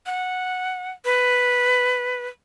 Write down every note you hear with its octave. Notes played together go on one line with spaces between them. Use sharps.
F#5
B4